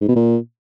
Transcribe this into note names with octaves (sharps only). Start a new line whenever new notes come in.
G#2
B2
A#2